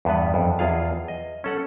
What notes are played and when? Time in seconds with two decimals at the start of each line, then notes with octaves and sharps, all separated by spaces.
0.05 E2 G2 B3 B4
0.34 F2
0.59 E2 F4 G#4 F5
1.08 D#5
1.44 C#4 A4 F#5